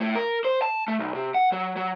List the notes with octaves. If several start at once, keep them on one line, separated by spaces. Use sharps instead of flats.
A2
A#4
C5
A5
A3
B1
C3
F#5
F#3
F#3